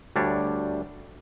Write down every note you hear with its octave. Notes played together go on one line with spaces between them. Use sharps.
D2 G3 D4 C#5